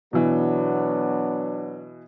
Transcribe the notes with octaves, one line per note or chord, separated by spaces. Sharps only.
B2 E3 F#3 B3 D4